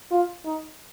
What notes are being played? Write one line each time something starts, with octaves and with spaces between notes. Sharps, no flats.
F4
D#4